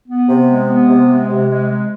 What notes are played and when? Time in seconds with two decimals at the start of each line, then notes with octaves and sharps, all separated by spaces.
0.08 B3
0.29 C3
0.49 G#3
0.69 B3
0.89 C3
1.09 G#3
1.29 C3
1.49 G#3
1.69 G#3